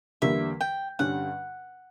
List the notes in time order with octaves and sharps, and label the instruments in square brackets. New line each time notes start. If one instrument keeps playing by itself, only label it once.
[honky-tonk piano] E2 D3 G3 A#3 [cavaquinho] E5
[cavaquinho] G5
[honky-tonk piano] G2 D3 G3 C#4 [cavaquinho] F#5